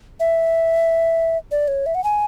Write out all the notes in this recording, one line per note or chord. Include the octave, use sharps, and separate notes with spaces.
E5
D5
C#5
E5
F#5
G#5